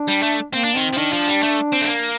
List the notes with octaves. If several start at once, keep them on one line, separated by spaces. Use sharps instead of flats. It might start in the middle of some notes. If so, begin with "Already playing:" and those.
Already playing: D4
G3
A3
A#3 C4
D4
D#3 C4
F3
D#3 D4
F3
G3
A3
C4
A3
A#3